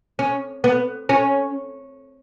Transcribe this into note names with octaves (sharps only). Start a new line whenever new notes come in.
C#4
B3
C#4